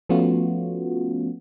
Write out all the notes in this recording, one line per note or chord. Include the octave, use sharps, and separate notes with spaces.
F3 A3 B3 C#4 F4 F#4